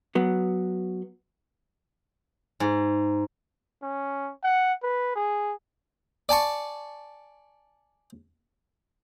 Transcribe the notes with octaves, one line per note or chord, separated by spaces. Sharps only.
F#3 B3
G#2
C#4
F#5
B4
G#4
D5 G#5 A5 C#6